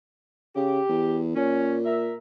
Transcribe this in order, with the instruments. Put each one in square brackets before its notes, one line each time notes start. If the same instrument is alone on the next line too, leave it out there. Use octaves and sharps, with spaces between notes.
[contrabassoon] C#3 [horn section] G4
[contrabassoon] E2
[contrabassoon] A#2 [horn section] C#4
[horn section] A#4 E5